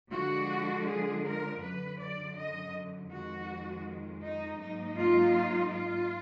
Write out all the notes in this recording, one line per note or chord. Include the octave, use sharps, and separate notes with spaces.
D3 F3 G#3 D4 F#4
G#4
A#4
F#2 D3 F#3 B4
D5
D#5
F2 D#3 G#3 F#4
D#4
G#2 F#3 A#3 D#4
F4
F4